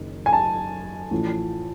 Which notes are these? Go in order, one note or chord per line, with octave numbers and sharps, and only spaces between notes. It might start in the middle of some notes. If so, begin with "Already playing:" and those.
Already playing: F#1 F#2 D#3
G#5
A5
A1 A2 F3